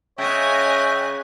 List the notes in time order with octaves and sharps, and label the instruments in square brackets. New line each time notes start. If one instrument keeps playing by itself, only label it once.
[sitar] C#3 [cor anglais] C#5 [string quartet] D#5 G#5 F#6 [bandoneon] E5 G5